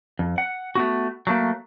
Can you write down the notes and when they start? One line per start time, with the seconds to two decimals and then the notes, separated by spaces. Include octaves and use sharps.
0.19 F2
0.38 F#5
0.75 A3 B3 F#4
1.27 F#3 A3 A#3